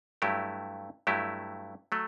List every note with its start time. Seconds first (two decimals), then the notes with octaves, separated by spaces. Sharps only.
0.22 G2 F#3 A3 E4 G4
1.07 G2 F#3 A3 E4 G4
1.92 F#3 A3